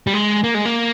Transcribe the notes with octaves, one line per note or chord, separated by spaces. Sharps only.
G3
G#3
A#3
G#3
A#3